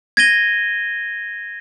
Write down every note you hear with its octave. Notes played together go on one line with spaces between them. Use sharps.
G#6 A#6 D#7 G7